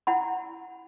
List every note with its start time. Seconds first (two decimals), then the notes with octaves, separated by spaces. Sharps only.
0.07 E4 F#5 B5